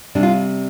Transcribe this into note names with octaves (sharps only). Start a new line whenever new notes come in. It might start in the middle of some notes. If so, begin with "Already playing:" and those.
C3 G3 D4
F4